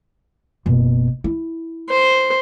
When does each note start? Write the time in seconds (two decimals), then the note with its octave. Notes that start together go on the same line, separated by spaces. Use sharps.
0.66 F#1 B2
1.24 E4
1.90 C5